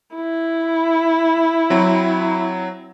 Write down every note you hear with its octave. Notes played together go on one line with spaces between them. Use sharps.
E4
F#3 C4